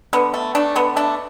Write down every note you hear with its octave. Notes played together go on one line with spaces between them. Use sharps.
D3 B3
A3
A3 D4
D3 B3
A3 D4